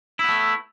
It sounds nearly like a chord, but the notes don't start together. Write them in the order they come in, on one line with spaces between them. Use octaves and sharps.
E4 B3 A3